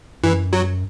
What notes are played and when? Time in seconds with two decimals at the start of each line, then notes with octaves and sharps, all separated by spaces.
0.23 F#2 E3
0.53 F#3